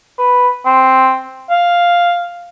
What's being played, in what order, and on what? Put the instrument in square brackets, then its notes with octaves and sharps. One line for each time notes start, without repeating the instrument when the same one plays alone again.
[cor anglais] B4
C4
F5